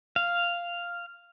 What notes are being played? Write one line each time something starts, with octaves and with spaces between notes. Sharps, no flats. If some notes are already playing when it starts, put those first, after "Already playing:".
F5